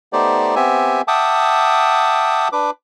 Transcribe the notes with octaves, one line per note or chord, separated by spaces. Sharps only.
A3 B3 D#4 G4 C5 D5
B3 C4 G4 E5 G#5
E5 F#5 G5 A5 D6 D#6
D4 B4 D6